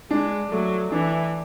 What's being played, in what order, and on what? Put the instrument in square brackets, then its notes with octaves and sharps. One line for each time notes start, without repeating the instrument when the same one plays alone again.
[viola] G#3 [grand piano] D4
[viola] F#3 [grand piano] A3
[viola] E3 [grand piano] D4